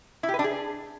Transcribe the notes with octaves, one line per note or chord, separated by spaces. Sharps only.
E4
G4
B4
D4
G#4